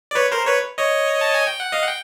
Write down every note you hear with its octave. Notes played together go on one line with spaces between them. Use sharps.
D5
B4 C#5
A#4 C5
B4 C#5
C#5 D#5
A5
G#5
G5
F#5
D#5 F5
F#5
G5